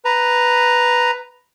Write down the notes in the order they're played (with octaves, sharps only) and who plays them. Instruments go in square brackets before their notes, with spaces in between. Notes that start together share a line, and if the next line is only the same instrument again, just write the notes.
[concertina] B4 A#5